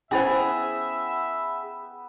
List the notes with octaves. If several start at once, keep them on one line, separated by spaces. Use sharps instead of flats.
B3 C#4 E4 G#4 B4 C5 E5 G5